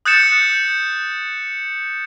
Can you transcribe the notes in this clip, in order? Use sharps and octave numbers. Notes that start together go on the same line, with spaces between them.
D#6 F#6 G6 A6 C#7 E7